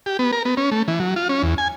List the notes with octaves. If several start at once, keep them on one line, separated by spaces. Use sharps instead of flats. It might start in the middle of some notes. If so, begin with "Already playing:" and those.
G4
B3
A#4
B3
C#4
A3
E3
F#3
F4
C#4
E2
G#5